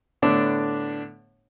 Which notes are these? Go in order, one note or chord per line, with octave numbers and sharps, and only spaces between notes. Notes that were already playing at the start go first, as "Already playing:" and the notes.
A2 D3 B3 D4